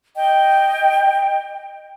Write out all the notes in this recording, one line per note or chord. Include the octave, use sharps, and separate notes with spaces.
D#5 G5